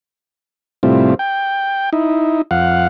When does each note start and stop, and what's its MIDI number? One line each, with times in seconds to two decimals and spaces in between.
0.83 1.14 45
0.83 1.14 48
0.83 1.14 55
0.83 1.14 60
0.83 1.14 64
0.83 1.14 65
1.19 1.90 79
1.93 2.42 63
1.93 2.42 64
2.51 2.87 41
2.51 2.87 77
2.51 2.87 78